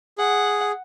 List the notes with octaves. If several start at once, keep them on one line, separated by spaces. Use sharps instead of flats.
G#4 F#5